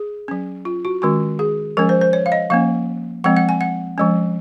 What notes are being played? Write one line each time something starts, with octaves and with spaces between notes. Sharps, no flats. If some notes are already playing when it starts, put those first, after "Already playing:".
Already playing: G#4
F#3 C#4
F4
F#4
D#3 G#3 C#4 F#4
G#4
F3 G#3 C#4 A#4
C5
C5
C#5
F5
D#5
F3 A#3 C#4 F5
F3 G#3 C4 F#5
F#5
G#5
F#5
F3 G#3 C#4